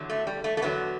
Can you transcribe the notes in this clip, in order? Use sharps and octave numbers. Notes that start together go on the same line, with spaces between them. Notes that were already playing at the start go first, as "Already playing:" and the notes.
Already playing: E2 D3 F#3
A3
G3
A3
A3
E2 D3 F#3 B3